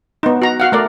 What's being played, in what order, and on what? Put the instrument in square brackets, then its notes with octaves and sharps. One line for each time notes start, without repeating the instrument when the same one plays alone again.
[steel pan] B3 D#4
F#4 A#5
F#4 F5 F#5
A3 A#4 D5